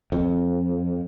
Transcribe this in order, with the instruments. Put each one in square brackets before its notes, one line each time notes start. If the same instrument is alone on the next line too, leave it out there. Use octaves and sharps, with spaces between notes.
[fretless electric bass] F2